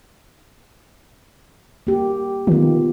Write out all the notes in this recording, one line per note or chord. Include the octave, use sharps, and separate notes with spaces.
A#3 G4
D#3 B3 F4